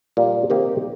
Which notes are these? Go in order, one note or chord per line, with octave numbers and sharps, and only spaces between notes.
A#2 G3 A#3
C3 D#3 A#3 D#4 G4